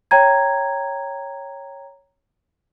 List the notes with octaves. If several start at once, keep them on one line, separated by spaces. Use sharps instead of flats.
C#5 G5 A#5 G#6